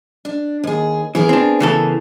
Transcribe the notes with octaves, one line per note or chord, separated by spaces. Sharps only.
D4
D#2 G#4
E3 B3 G#4 A#4
C4 D4
C#3 E3 A4